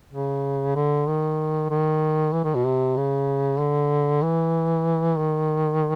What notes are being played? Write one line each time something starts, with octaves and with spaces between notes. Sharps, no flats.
C#3
D3
D#3
D#3
E3
D#3
B2
C3
C#3
D3
E3
D#3